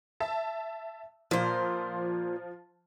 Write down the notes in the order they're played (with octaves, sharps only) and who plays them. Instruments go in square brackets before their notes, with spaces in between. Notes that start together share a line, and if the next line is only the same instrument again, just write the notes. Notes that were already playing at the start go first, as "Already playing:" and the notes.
[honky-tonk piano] E5 A5
[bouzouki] A#2 C5 [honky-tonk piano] F3 F4